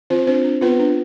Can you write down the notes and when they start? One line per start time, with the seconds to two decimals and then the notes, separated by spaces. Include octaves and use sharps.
0.10 C4 F4 C5
0.27 C4 D4 C5
0.44 D4
0.61 B3 F4 B4
0.79 D4